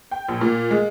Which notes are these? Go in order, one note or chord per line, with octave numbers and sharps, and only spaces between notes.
G5
A#1
A#2
G#3